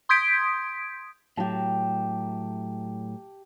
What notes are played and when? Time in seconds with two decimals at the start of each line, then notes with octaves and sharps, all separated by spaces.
0.09 C6 D#6 G6 G#6 B6 D7
1.37 A2 F#3 G4 A5